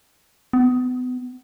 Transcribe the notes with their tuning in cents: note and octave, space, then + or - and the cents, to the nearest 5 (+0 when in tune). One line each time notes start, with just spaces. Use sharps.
B3 +30